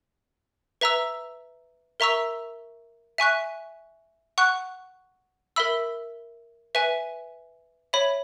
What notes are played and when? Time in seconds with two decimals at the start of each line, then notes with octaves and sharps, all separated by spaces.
0.81 B4 E5 A#5 E6
2.00 A#4 E5 A#5 C#6 E6
3.18 E5 G#5 C#6 F#6
4.38 F#5 C#6 F#6
5.56 A#4 E5 B5 E6
6.75 B4 E5 G#5
7.93 C#5 E5 B5